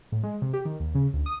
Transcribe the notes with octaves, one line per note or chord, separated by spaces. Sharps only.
A2
G#3
C3
G4
D#3
D#2
C#3
D2
D#6